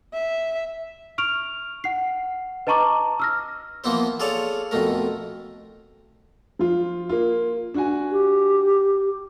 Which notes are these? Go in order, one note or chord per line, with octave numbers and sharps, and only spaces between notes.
E5
C#6 F6 D7 F7
F#5 C7
B4 D#5 A5 A#5 C#6 D6
E6 F6 A#6
E3 F3 A#3 B3 E4 C5
F4 G#4 A4 C#5 D5 F5
F2 B2 A3 A#4
F3 F4
A#3 F4
D4 F#4 G#5
G4